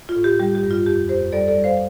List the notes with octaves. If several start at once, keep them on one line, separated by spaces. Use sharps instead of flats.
F4
A2
G4
G3 G4
G4
G2
F4
F2 G4
F2 G4 C5
G3 A4 D5
A4 D5
G3
C5 F5